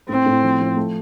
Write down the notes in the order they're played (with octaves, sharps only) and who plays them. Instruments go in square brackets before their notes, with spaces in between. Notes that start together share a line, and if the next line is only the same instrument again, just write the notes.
[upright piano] A2 [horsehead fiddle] C4
[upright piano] A2
F3
F3
A3